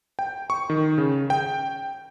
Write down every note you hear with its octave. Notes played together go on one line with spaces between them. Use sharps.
G5
C#6
D#3
C#3
G5